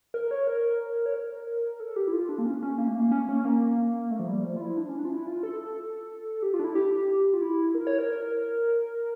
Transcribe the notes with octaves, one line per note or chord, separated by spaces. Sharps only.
A#4
C#5
A#4
C#5
A#4
A4
G4
E4
F4
D4
A#3
C#4
C#4
A#3
A3
A#3
C#4
C#4
A#3
A3
F3
G3
F3
F4
E4
D4
C#4
D4
F4
E4
F4
A4
G4
F4
D4
E4
G4
F4
E4
A#4
C#5
A#4